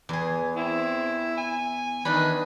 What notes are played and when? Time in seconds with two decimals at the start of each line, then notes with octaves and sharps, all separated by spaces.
0.09 E2 G#4
0.56 C4 E4
1.38 G#5
2.05 D#3 E3 D4 D#4 B5